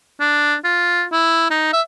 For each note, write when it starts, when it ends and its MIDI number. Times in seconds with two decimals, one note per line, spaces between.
0.20 0.56 62
0.64 1.04 65
1.12 1.48 64
1.50 1.69 63
1.73 1.81 76